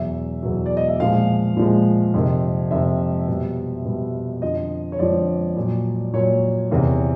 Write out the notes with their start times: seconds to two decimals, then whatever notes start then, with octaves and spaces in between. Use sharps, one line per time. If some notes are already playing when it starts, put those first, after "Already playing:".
Already playing: E2 B2 F#3 E5
0.43 E2 B2 F#3
0.66 D5
0.77 D#5
0.89 E5
0.99 A#2 F3 G#3 F5
1.57 A#2 F3 G#3
2.14 F2 C3 D#3
2.71 F2 C3 D#3 E5
3.28 B2 G3
3.85 B2 G3
4.42 F2 D3 F3 D#5
4.92 C#5
4.99 F2 D3 F3 D5
5.56 A#2 F#3
6.13 A#2 F#3 C#5
6.71 E2 C3 D#3